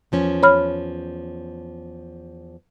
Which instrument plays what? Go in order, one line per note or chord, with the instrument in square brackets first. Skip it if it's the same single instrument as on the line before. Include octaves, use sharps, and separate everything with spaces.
[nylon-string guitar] E2 F3 C#4
[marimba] C#5 B5 F6